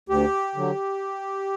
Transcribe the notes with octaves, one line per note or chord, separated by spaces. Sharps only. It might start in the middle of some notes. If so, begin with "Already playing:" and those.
D2 G4
D3 F#3